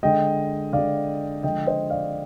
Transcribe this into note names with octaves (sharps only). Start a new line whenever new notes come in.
D3 G#3 D#5 G5
D3 G#3 D5 F5
D3 F3 G#3 D#5 G5
C5 D#5
D5 F5